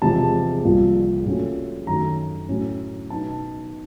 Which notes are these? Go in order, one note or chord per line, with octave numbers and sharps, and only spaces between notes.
E2 C3 F3 G#3 A5
C2 A#2 F3 A#3
A#2 F#3 A3 C#4
F#2 D#3 F#3 A3 A#5
A2 F#3 A3 C#4
B2 F#3 B3 D#4 A5